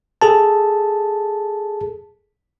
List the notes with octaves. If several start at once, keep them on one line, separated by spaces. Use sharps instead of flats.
G#4 A4 A5